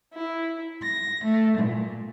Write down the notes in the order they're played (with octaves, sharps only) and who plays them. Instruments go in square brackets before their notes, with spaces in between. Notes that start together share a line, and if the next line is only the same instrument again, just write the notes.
[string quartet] E4
A#6
A3
A#2